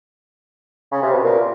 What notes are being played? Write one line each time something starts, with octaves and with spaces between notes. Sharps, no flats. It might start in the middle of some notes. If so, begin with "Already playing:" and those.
C#3
C3
B2
A#2